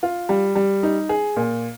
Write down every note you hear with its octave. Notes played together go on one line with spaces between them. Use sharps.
F4
G3
G3
D#4
G#4
A#2